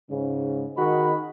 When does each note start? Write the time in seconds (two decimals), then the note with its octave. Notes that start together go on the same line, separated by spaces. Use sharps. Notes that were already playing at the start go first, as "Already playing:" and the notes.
0.10 G#2 C#3
0.78 D#3 F#4 G#4 D#5 B5